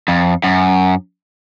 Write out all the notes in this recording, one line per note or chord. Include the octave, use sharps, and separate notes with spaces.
F2
F#2